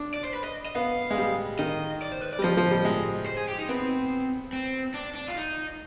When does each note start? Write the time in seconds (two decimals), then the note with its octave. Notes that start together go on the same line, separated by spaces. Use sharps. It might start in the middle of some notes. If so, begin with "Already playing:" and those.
Already playing: D4
0.14 D5
0.24 C5
0.34 B4
0.44 D#5
0.66 D#5
0.75 B3 F5
1.11 G#3
1.18 G3
1.59 D#3 D#5
2.02 D5
2.12 C5
2.22 B4
2.33 D5
2.39 G3
2.43 F3 D#5
2.57 F3
2.71 G3
2.85 G#3
3.26 C5
3.37 G#4
3.48 G4
3.59 D#4
3.68 B3 C4
4.53 C4
4.94 D4
5.15 D4
5.28 F4
5.36 D#4